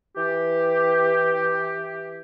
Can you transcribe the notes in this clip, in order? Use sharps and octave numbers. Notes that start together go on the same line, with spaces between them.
E3 G4